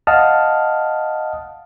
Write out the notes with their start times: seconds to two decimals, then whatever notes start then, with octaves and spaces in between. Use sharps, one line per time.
0.07 D#5 F5 F#5 A5 D#6 F6